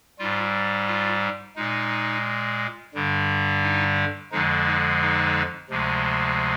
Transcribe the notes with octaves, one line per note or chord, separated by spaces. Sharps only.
G#2 G3 F4
F4
A#2 G#3 D#4
G2 D3 G3
D#4
F2 D3 F3 G#3 D#4
D#4
D#4
D2 C3 F3 G#3